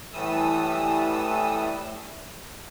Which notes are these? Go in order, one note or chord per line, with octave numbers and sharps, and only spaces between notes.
A2 E3 G3 A3 D#6 E6